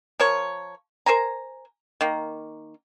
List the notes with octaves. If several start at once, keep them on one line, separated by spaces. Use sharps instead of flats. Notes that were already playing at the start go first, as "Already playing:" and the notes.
F3 A#4 C#5
A#4 C5 G#5 A#5
D#3 A#3